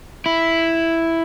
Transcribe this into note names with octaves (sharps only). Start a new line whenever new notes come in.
E4